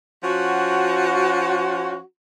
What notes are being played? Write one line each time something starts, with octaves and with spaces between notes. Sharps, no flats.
F3 C#4 F#4